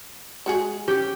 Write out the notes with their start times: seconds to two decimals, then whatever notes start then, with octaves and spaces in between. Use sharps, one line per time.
0.46 G#3 F#4 G#4
0.88 C#4 G4